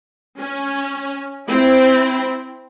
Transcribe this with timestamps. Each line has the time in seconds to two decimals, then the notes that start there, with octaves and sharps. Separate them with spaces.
0.38 C#4
1.48 C4 E4